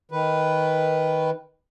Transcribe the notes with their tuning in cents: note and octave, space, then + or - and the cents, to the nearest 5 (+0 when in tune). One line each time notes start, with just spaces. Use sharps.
D#3 +15 B4 +0